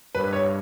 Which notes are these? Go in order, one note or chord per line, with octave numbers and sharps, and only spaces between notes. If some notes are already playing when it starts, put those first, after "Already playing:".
G2 B4
C#5